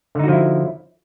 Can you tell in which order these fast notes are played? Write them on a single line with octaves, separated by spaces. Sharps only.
D3 D#4 F#4 F3 E4